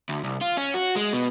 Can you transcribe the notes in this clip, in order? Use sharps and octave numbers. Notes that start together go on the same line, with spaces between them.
D2
C2
F4
C#4
F#4
G#3
B2